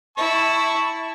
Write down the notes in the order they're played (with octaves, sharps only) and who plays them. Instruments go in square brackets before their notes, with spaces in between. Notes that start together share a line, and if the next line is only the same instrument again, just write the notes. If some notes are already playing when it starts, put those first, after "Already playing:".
[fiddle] E4 [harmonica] A5 C#6